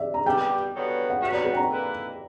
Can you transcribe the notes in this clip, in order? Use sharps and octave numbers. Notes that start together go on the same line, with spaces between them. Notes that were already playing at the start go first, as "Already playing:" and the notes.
Already playing: D5 E5
A#5
G3 B3 D4 G4 G5
G2 D3 F#3 B3
F#5
G2 F#3 B3 F#4 E5
D5
B4
G5
A#5
D3 A#3 E4 B4